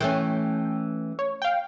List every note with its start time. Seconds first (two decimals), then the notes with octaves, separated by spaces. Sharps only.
0.01 E3 A3 C#4 G5
1.19 C#5
1.42 F5 G5